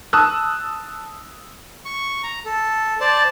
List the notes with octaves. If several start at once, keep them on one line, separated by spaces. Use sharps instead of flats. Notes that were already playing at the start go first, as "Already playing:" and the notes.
A5 D#6 E6 F#6
C#6
A#5
A4
C5 D5 A5